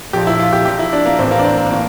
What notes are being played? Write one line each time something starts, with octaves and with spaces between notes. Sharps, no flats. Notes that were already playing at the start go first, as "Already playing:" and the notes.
A#1 A#2 G4
E4
F4
G4
A#1 A#2 G4
E4
D4
A#3
A1 A2 E3 C4
A#3
D4
C4
A#3
A2 E3 A#3